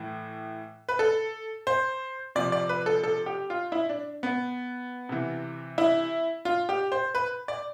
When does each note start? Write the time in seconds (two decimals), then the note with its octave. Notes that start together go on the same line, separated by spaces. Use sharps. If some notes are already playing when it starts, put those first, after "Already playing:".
Already playing: A2 E3
0.89 B4
0.99 A4
1.67 C5
2.35 C3 F3 D5
2.52 D5
2.69 B4
2.86 A4
3.04 A4
3.26 G4
3.50 F4
3.72 E4
3.89 D4
4.23 B3
5.09 C3 E3
5.78 E4
6.45 F4
6.69 G4
6.92 C5
7.15 B4
7.48 D5